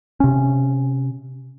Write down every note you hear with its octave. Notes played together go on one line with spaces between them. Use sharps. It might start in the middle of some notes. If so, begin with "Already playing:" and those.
C3 C#4